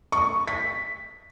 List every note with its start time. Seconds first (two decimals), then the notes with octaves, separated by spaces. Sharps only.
0.12 C#6
0.47 B6